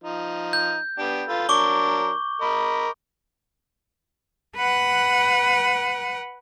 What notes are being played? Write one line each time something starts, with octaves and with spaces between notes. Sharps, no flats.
F3 D#4
G6
B3 D4 G4
F4 A4 B4
F#3 D4 A#4 C#6 D6 G7
A#4 D#5 B5
B4 F#5